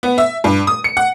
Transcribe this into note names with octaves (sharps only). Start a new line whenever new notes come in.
B3
E5
G2
D#6
C#7
F#5